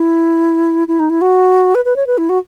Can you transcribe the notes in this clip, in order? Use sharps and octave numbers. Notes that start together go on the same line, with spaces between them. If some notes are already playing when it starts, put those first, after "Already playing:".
Already playing: E4
E4
D#4
E4
F#4
B4
B4
C#5
B4
E4
F#4